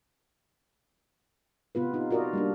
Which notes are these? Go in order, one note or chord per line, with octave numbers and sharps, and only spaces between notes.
C3 B3 F4 B4
D#4 F4
F4 F#4 A#4 D5 D#5
G3 A#3 D4